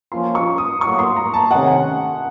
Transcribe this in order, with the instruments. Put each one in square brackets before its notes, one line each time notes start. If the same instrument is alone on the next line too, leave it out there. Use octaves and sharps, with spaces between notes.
[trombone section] F3 A#3 C#4 F4 [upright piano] C6
[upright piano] C#6
D#6
[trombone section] A2 F#3 A#3 [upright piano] C#6
[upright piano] C6
A#5
A5
[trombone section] C3 D#3 A3 C#4 [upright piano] F#5